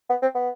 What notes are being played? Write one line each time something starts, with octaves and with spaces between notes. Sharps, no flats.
B3
C4
B3